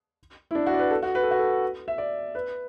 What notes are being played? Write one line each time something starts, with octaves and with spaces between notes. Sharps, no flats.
E4
D4
F#4
D5
B4
A4
F#4
B4
A4
F#4
A4
E5
D5
B4